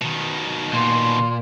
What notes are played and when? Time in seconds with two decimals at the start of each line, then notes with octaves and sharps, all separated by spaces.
0.01 B2 D#3
0.73 A#2 C6